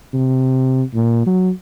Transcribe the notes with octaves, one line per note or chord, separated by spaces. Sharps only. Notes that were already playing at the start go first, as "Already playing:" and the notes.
C3
A#2
F#3